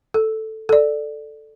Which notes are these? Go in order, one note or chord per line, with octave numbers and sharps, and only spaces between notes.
A4
A4 D5